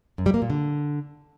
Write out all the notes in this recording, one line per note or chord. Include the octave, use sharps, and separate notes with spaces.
F#2
G3
A#3
A#2
D3